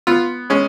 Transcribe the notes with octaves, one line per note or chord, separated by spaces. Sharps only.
B3 F4
G#3 C#4